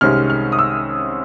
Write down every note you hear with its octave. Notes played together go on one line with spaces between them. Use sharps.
C2 C3 D#3 G#3 C#4 F6
F6
D#6
E6